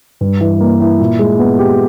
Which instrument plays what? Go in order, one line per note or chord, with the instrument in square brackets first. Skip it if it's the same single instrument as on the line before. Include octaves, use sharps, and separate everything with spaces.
[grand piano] G2
E3
A#3
E4
A#2
G#3
B3
G4